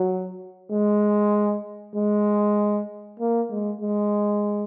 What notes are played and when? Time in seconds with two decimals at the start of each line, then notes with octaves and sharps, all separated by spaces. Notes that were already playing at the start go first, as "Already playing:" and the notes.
Already playing: F#3
0.72 G#3
1.96 G#3
3.20 A#3
3.51 G#3
3.81 G#3